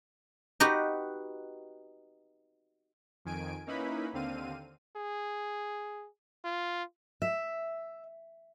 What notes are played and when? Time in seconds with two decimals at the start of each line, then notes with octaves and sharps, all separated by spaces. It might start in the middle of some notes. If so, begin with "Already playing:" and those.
0.60 D#4 F#4 G4 B4
3.25 F2 D#3 G#5 D7
3.66 A#3 C#4 D#4 E4 B4 B5
4.13 D#2 D3 C4 F5 D#7
4.96 G#4
6.45 F4
7.22 E5